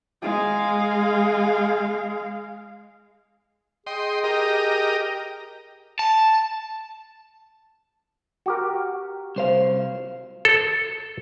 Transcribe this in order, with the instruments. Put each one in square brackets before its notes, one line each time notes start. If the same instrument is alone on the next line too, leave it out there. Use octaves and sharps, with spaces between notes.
[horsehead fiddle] G#3 F5
[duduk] G#4 [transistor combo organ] D#5 G5 C6
[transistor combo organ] G4 A#4 D#5
[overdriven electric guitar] A5
[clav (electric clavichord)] F#4 G4 A#4
[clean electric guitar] C2 C5 F5
[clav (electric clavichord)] A4